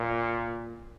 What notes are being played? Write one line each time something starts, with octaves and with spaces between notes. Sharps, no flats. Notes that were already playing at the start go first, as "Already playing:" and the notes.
Already playing: A#2